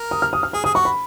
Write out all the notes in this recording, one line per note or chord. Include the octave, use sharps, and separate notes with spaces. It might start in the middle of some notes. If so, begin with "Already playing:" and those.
Already playing: A#4
D#6
F6
D#6
F6
G#4 D#6
G#4 D#6
F#4 C#6
B5